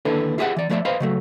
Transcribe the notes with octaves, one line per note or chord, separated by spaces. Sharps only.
D#2 D3 D4 E4 A4 B4
F4 G4 G#4 E5 F#5
E3 D5
F3 A3 B4 C#5 D5 E5
B4 C5 D#5 F5 B5
C#3 F#3 A3